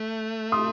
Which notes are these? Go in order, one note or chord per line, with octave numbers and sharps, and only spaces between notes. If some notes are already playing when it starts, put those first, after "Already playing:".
Already playing: A3
C6 D#6